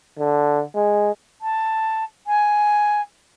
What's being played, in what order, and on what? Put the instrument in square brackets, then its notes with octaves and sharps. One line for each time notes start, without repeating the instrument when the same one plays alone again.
[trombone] D3
G#3
[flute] A5
G#5